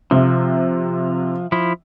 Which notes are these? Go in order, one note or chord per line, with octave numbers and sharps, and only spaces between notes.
C3 F3
F3 E4